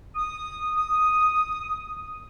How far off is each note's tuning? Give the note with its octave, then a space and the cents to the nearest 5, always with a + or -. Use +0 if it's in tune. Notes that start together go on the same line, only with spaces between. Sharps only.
D#6 -5
D#6 +0